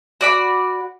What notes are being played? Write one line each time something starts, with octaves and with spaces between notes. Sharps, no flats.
F#4 D5 B5